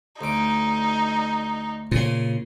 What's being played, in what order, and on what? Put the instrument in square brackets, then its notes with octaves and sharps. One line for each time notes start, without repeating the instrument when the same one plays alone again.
[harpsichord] D2 D6 [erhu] D#4
[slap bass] A#2 C#3 [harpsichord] C5 G#5